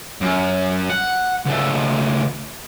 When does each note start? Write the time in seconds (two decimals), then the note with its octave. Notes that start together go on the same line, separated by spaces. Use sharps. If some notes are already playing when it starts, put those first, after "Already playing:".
0.21 F#2
0.90 F#5
1.45 C#2 A3